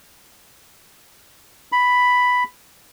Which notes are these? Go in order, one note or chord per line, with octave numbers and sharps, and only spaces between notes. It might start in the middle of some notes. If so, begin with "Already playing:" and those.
B5